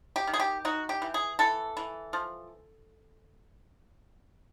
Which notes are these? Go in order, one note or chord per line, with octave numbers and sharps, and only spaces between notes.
G4
D#3
G#4
G4
D#4 F#4
G4
E3
G#4
E3 A4
E3
F3